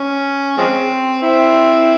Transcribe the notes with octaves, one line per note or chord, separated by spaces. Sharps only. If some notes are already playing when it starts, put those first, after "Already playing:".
Already playing: C#4
F3 G#3 C4
C4 E4